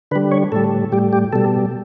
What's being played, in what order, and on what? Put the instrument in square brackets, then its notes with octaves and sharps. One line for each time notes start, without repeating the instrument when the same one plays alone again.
[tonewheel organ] D3 B4
G3
C#5
A2 G3 A4
A2 G3 G4
G4
B2 G3 A4